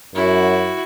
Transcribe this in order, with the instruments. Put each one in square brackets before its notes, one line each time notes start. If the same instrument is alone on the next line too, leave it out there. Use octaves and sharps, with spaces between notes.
[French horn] F#2 [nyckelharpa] E4 F#4